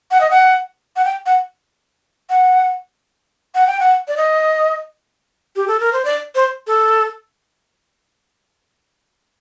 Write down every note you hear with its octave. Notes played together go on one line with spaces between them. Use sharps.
F#5
D#5
F#5
F#5
G5
F#5
F#5
F#5
G5
F#5
D5
D#5
G4
A4
A#4
C5
D5
C5
A4